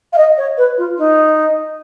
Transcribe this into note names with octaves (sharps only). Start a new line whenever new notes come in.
F5
D#5
C#5
B4
F4
D#4